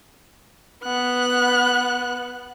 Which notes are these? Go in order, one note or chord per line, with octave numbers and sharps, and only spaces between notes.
B3 F#6